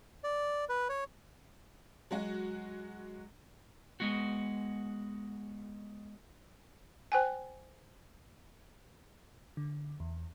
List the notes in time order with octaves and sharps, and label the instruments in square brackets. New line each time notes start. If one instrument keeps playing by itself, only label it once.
[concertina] D5
B4
C#5
[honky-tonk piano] F#3 G#3 F#4
[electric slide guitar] G#3 B3 F#4
[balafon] C5 G5 G#5
[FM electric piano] D3
E2